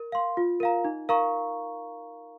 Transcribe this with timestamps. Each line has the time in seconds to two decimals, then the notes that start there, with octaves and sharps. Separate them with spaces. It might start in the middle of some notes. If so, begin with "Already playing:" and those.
Already playing: A#4
0.12 F5 C6
0.37 F4
0.60 A#4 F5 A#5
0.85 D#4
1.09 A#4 F5 A#5 C#6